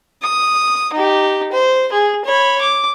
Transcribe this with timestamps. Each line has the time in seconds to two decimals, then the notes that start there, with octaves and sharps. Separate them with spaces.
0.22 D#6
0.93 D#4 G4
1.52 C5
1.92 G#4
2.25 C#5 B5
2.61 D6